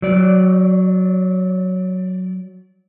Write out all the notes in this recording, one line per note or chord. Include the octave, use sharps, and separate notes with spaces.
F#3 D5